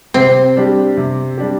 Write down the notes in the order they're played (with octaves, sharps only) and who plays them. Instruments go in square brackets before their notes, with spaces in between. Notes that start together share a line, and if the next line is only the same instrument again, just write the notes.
[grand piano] C3 [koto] C4
[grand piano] G3 D4 G4
C3
G3 D4 G4